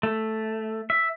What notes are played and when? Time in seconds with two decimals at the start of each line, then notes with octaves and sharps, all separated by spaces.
0.03 A3
0.90 E5